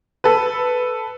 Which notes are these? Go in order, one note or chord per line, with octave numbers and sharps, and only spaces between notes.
A4 B4